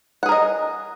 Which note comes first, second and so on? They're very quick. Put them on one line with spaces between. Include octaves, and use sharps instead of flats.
F#5 G#4 A#4 D#5